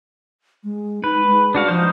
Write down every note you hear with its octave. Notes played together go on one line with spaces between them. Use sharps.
G#3
D#4 B4
G#3
D4 F#4 F5
F3 D#4 C5